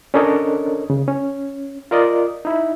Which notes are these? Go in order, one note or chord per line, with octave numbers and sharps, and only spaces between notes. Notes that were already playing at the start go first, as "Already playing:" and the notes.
C#4 D4 A4 A#4 C#5 D#5
C#3
C#4
F4 A#4 D5 D#5
D#4 E4